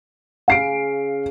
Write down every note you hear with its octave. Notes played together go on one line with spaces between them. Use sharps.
C#3 F5 C7 D7